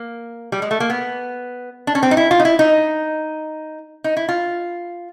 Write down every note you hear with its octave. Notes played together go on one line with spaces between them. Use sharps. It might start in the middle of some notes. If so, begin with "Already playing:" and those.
Already playing: A#3
G3
G#3
A3
A#3
B3
D4
C#4
C4
D#4
E4
F4
D#4
E4
D#4
D#4
E4
F4